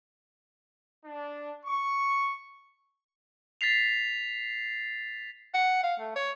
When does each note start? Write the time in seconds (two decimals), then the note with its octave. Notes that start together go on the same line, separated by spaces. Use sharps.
1.05 D4
1.66 C#6
3.61 A6 B6 C7 F7
5.54 F#5
5.83 F5
6.00 A3
6.16 C#5